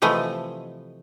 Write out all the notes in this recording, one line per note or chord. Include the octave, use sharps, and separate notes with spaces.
C3 E3 F3 A3 D#5